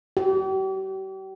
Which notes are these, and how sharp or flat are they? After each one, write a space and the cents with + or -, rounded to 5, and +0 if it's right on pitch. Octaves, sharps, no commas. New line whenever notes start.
G4 -40